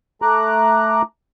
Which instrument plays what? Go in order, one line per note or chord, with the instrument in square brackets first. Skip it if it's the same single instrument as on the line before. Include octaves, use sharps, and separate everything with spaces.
[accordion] A3 A#5 D6 F#6